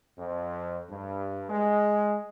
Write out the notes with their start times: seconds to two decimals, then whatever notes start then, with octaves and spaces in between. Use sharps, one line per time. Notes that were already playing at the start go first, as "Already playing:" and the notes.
0.18 F2
0.90 G2
1.49 G#3